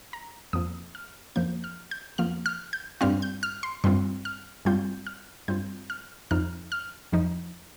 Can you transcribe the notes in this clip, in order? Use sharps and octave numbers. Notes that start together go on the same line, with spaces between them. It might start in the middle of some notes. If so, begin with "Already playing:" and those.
A#5
F2 F3 A#3 D#6
F6
F2 F3 A#3 G6
F6
G6
F2 F3 A#3 F6
F6
G6
G2 G3 C4 F4 F6
G6
F6
C6
G2 G3 C4 F4 C6
F6
G2 G3 C4 F4 G6
F6
G2 G3 C4 F4 G6
F6
F2 F3 D#4 F6
F6
F2 F3 D#4